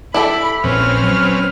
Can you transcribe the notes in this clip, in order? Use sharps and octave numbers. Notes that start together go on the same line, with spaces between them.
E4 G4 A4 B5
A#1 C4 C#4 B4 F6
F#3